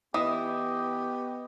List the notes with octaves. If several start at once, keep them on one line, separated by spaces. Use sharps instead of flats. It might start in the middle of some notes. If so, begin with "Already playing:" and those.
E3 B3 G4 D#5 D#6 E7